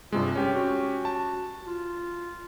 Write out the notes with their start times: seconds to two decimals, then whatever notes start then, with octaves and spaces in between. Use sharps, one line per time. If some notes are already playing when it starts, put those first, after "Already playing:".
0.12 G2 C3 G#3 F4
0.35 C#4 G4
0.55 F#4
1.05 A5
1.67 F4